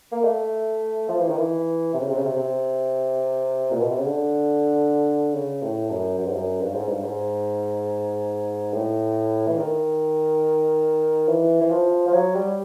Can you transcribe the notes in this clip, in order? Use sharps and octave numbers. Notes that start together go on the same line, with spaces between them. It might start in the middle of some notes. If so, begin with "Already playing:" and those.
A#3
A3
F3
E3
D#3
E3
C3
C#3
C3
C#3
C3
C3
A#2
B2
C3
C#3
D3
C#3
A2
F#2
F#2
G2
F#2
G2
G#2
G2
G#2
A2
E3
D#3
E3
E3
F3
F3
F#3
G3